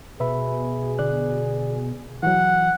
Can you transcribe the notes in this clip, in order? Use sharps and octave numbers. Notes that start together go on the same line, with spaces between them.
B2 G#4 B4 E5 B5
D3 D5 F#6
E3 F#3 F#5